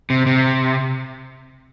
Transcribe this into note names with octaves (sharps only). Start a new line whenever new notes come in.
C3
C3